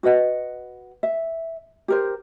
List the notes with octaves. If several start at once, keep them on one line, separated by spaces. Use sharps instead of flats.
F#4 B4 D#5 F#5
E5
G4 A#4 C5